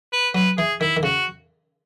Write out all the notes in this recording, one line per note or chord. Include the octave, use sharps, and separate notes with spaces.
B4
F#3 B4
E3 G#4
D#3 E4
D#3
C#3 F#4